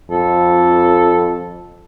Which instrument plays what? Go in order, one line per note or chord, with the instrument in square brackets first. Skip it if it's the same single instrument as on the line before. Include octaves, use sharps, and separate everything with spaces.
[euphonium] F2 [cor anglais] A4